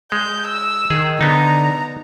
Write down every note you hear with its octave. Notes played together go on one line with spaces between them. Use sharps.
G#3 G6
E6
D#3 G#4
D3 B3 D#4 A#5